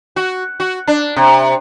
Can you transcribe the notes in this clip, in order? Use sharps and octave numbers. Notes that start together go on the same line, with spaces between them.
F#4
F#4
D4
C3